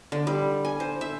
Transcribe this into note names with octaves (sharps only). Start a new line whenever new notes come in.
D3
G3
G#5
C5
E5